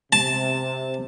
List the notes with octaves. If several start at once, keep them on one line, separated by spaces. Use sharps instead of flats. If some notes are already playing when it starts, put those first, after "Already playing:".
C3 A5